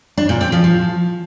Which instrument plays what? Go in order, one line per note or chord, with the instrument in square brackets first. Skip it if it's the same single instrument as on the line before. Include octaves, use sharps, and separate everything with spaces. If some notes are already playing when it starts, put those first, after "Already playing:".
[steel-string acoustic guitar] D4
A#2
C4
F3
F3